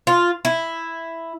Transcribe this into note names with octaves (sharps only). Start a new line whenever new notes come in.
F4
E4